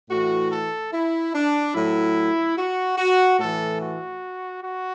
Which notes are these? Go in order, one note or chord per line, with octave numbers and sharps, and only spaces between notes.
A2 E3 F#4
A4
E4
D4
A2 F#3 E4
F#4
F#4
A2 E3 A4
F#4
F#4